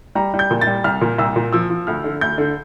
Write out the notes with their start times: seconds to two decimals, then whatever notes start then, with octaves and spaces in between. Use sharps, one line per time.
0.15 G3 A#5
0.34 G3
0.39 G6
0.51 A#2
0.61 A6
0.67 G3
0.84 C2 F6
1.01 A#2
1.18 C2 E6
1.36 A#2
1.53 F3 E6
1.70 F3
1.87 D2 F6
2.04 D3
2.21 D2 G6
2.38 D3